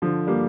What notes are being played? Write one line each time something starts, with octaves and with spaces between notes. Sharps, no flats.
D3 F3
G3 A#3